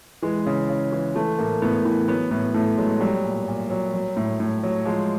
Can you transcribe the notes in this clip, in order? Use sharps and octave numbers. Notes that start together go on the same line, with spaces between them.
E3 G#3
C#3
C#3
E3
E3 A3
A2 A#3
A2 B3
E3 B3
F#3 B3
A2 B3
A2 A3
F#3 G#3
F#3 G3
A#2
A#2
F#3
F#3
A2
A2
F#3
F3 G#3